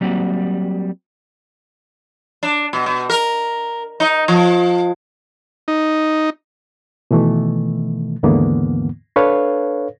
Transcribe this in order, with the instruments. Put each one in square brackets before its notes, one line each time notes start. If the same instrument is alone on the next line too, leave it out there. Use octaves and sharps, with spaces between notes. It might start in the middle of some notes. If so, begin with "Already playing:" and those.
[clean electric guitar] F#3 G3 A#3 C4 F#4
[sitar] D4
B2
B2
A#4
D#4
F3
[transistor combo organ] D#4
[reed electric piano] B2 D#3 E3 A3
D#2 G#2 D3 E3 A#3 B3
D4 A4 B4 C#5 F5